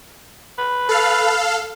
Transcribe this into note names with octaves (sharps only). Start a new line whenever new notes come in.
B4
A4 F5